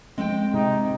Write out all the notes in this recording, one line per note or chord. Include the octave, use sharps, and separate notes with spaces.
G#3 C4 G5
G#2 C3 D#4